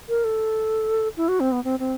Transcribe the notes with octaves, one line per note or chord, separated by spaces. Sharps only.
A#4
A4
E4
F#4
C4
B3
C4
C4